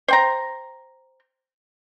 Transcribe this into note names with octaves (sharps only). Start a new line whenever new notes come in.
C5 G5 A#5